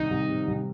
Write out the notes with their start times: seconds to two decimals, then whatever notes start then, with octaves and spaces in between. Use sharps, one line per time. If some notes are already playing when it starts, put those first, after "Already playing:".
Already playing: C2 D#3 D#4
0.11 C2
0.29 C3
0.48 C2